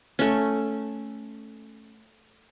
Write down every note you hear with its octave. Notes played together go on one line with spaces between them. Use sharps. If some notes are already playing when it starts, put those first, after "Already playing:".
A3 C#4